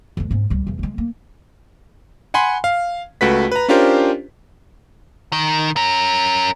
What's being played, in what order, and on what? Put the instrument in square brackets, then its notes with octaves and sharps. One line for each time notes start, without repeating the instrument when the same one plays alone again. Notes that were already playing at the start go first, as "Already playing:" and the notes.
[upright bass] F2 G#3
G#2 C#4
C#2 G3
E2 C#3
C#3 G#3
A#3
[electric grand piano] F#5 G#5 B5 C6
F5
C#2 A3 F#4 B4 B6
B4 A#5
C#4 D4 F4 G4 A#4 C5
[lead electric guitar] D#3
C#4 A#4